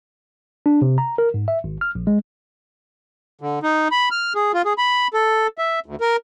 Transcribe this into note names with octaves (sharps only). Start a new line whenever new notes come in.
D4
C3
A#5
A#4
G#2
E5
G#1
F6
A#1
G#3
D3
D#4
B5
F6
G#4
F4
G#4
B5
A4
E5
D2
A#4